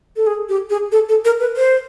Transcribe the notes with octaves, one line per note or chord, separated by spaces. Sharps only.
A4
G#4
G4
G#4
A4
A4
A#4
B4
C5